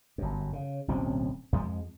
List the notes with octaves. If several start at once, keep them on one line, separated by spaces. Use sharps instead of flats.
G1 F#2
C#3
D1 B1 C4 C#4
F2 F3 G#3